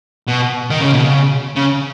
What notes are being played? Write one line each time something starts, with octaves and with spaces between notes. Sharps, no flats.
B2
D#3
C#3
B2
C#3
C#3